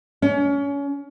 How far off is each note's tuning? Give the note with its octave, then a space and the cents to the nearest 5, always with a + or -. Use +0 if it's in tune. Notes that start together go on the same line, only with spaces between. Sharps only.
C#4 +30